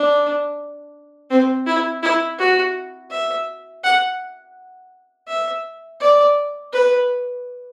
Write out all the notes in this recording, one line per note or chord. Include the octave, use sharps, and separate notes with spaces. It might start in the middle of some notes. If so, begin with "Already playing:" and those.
Already playing: D4
C4
E4
E4
F#4
E5
F#5
E5
D5
B4